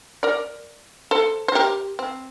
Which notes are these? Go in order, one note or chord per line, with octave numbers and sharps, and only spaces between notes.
A#4 D5
A4 C5
C5
G4 A#4
C4